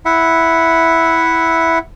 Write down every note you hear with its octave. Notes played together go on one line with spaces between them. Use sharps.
E4 E5 F#5